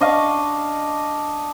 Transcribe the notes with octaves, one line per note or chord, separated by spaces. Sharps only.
D4 D#5 F5 C#6